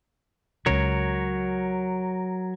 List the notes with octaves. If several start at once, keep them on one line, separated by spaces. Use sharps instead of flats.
C#2 C#3 F#3 A#4 C#5